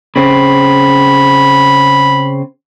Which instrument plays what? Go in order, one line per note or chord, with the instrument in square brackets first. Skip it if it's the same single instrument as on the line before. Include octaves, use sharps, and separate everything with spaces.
[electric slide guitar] C#3 C4 [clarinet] B5